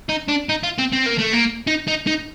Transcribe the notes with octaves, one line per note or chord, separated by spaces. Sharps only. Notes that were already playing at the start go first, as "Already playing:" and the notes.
D#4
D4
D#4
F4
C4
C4
A#3
A3
A#3
D#4
D#4
D#4